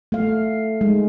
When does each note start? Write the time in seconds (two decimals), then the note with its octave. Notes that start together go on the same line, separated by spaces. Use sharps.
0.12 A3 F5
0.81 G#3